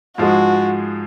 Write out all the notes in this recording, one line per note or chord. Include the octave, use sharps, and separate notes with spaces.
G#2 F3 G#3 F#4